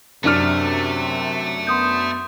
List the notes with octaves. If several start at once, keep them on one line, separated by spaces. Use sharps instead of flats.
F#2 C3 A3 D4 F6
B3 C6 D#6 G6